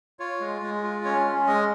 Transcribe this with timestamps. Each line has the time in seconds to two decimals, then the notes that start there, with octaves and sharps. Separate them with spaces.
0.19 F4 C#5
0.41 G#3
0.62 G#3
0.83 F4
1.05 C#4 C#5
1.26 C#4
1.47 G#3 D#5